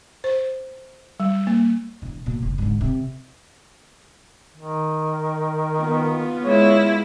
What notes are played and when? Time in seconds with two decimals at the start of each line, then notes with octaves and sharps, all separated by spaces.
0.24 C5
1.20 G3
1.47 A#3
2.02 E1
2.26 B2 A#3
2.42 F#1 F#2
2.58 G#2 D3
2.81 C3
4.57 D#3
5.80 B3 F4
6.44 G#3 E4 C#5